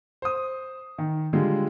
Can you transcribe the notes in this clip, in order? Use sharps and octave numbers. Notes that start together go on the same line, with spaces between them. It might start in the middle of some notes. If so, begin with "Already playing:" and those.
C5 D#6
D#3
D3 G3 G#3 F4